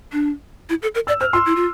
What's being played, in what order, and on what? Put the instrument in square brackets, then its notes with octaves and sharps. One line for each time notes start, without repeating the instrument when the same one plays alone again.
[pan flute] D4
E4
A4
A#4
[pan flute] D5 [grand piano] E6
[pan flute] C5 [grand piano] F6
[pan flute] F4 [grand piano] C6 E6
[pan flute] E4
F4